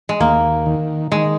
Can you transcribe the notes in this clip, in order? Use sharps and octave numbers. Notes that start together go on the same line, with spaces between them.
G#3
D#2 A#3
D#3
D#3 G#3